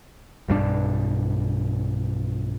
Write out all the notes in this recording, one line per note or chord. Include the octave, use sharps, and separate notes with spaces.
B1 G2 F#3 D4